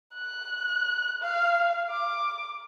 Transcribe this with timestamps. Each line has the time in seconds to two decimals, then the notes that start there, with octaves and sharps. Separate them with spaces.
0.14 F#6
1.22 F5
1.90 D6